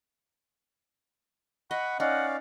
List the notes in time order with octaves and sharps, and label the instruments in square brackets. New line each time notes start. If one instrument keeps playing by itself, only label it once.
[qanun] D#5 [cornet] F#5 [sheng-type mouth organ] B5 C#6
[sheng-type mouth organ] C#4 D5 F5 [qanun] D#4 [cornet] F#5